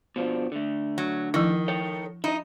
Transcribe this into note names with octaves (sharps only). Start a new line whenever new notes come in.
B2 F3 D4
D3 A3
F#3
D#3 F3 E4
A4 C#5 G5
D#4 E4 D#5